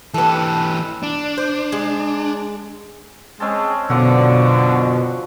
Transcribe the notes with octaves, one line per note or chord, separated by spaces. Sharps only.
E3 G4 A4 B4
D4
C5
G#3
G#3 C4 C#4 A5
F#2 B2 D3 F3 F#4